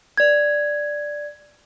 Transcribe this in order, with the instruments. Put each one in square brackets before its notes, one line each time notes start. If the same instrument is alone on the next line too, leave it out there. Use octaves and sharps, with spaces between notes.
[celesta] D5 G#6